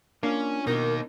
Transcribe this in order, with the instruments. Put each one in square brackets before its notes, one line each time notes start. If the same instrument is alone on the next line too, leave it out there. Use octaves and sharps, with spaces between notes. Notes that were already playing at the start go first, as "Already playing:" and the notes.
[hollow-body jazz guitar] A#3 [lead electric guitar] C#4 [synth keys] D4 F4
[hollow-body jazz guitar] B2 [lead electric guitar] A#3 D#4 [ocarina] A#4